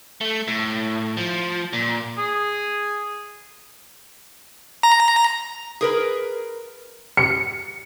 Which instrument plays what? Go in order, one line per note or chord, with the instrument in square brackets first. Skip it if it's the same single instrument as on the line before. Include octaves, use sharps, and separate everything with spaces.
[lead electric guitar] A3
A2
F3
A#2
[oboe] G#4
[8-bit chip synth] A#5
[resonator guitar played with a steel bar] G#4 A#4 B4
[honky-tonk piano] C#7